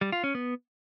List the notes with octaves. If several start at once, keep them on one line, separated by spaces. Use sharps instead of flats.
G3
F4
C#4
B3